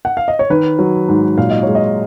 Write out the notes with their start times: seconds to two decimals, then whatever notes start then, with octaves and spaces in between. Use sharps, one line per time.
0.05 F#5
0.17 F5
0.28 D#5
0.39 C#5
0.50 D#3 B4
0.79 F#3
1.09 G#2
1.38 A#2 F5
1.50 D#5
1.63 G#3 C#5
1.75 D#5